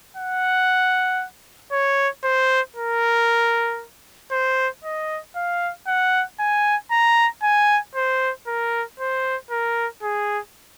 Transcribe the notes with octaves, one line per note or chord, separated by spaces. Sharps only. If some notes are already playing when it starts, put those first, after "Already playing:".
F#5
C#5
C5
A#4
C5
D#5
F5
F#5
G#5
A#5
G#5
C5
A#4
C5
A#4
G#4